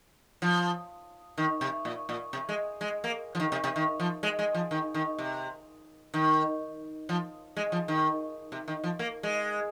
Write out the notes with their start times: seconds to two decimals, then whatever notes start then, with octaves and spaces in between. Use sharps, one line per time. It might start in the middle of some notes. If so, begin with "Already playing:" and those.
0.42 F3
1.38 D#3
1.61 C3
1.85 A#2
2.09 A#2
2.33 C3
2.49 G#3
2.81 G#3
3.04 A#3
3.35 F3
3.40 D#3
3.52 C3
3.64 C3
3.76 D#3
4.00 F3
4.23 G#3
4.39 G#3
4.55 F3
4.71 D#3
4.94 D#3
5.18 C3
6.14 D#3
7.09 F3
7.56 G#3
7.72 F3
7.88 D#3
8.52 C3
8.68 D#3
8.84 F3
8.99 A#3
9.23 G#3